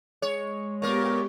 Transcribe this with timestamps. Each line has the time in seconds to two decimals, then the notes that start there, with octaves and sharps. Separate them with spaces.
0.22 G#3 C#5
0.82 A#2 B3 G4 A#4 C#5